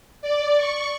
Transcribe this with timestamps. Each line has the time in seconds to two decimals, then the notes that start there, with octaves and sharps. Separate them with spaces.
0.22 D5
0.57 C#6